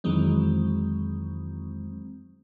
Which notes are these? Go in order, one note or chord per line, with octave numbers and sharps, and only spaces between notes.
F2 D#3 E3 F#3 G#3 C4